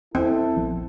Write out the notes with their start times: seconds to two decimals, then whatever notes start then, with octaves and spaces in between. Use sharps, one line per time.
0.15 E2 C4 E4 A4
0.56 A#1 F3 B3